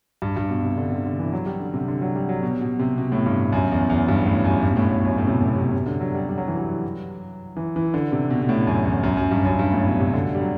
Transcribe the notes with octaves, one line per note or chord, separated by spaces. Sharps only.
G2
G2
B2
C3
D3
C3
D3
E3
F#3
G3
D3
C3
D3
F#3
G3
F#3
B2
B2
C3
B2
A2
G2
F#2
E2
E2
G2
A2
F#2
G2
B2
A2
A2
F#2
A2
C3
B2
A2
B2
C3
B2
C3
D3
F#3
G3
G3
F#3
E3
F#3
E3
E3
D3
C3
B2
B2
A2
F#2
E2
F#2
F#2
G2
F#2
G2
A2
B2
C3
D3
G3
F#3